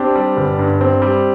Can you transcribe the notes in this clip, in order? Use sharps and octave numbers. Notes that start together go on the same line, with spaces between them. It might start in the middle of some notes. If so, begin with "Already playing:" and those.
Already playing: C4 D4 G4
G3
G1
G2
C4
G3